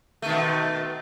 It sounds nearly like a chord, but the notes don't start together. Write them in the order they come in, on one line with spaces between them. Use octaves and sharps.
A3 D#3 B2